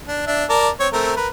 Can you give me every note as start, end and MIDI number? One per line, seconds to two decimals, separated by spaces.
0.08 0.24 62
0.27 0.44 62
0.27 0.44 76
0.49 0.69 70
0.49 0.69 74
0.49 0.69 81
0.80 0.88 60
0.80 0.88 73
0.93 1.14 57
0.93 1.14 60
0.93 1.14 70
1.17 1.28 70
1.17 1.28 71